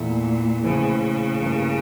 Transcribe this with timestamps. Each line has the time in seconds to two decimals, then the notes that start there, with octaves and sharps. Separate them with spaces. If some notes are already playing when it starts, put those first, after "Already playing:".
Already playing: E2 A#2 E3 A3 E4
0.64 A#1 A2 C#3 E3
1.41 A1 G2 E3 A#3